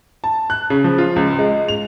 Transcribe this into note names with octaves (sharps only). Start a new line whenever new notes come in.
A5
F#6
C#3
F3
F4
C#2
G#3
F7